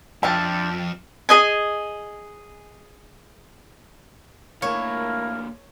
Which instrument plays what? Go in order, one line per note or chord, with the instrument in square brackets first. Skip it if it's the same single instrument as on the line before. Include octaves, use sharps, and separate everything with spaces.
[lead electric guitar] F2 [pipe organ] C4 D4 [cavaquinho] E5 F5 A5 [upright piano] G5
[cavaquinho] G#4 D#5 G#5
[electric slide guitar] D3 A#3 A5 [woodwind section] A3 E4 A#4 [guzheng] C#5 [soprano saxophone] F5